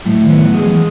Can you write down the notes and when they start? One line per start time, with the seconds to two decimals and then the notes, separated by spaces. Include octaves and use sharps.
0.05 A2 F#3
0.23 D#3
0.30 B3
0.42 F#3
0.54 G#3
0.60 E3